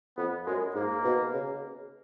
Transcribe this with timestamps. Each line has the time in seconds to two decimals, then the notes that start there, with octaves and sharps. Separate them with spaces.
0.17 F2 B3
0.47 F#2 G#3
0.75 G#2 A#3
1.04 B2
1.33 C#3